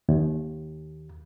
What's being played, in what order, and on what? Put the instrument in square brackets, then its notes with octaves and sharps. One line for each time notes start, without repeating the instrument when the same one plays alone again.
[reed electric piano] D#2